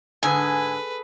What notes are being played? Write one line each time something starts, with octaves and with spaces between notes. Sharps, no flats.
G#2 D3 G#4 A4 B4 G#5